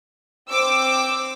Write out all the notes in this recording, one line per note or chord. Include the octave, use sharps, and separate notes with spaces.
C4 D6 E6